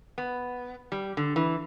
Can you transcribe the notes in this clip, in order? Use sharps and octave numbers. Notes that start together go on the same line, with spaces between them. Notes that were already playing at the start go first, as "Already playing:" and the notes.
B3
G3
D3
E3